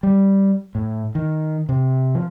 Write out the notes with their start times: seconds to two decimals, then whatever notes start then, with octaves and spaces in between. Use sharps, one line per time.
0.03 G3
0.75 A2
1.15 D#3
1.69 C3
2.15 F3